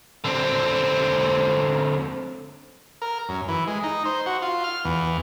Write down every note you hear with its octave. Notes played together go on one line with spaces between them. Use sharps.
D3 C4
A#4
F#2
E3
G#3
D#4
C5
F#4
F4
F6
E2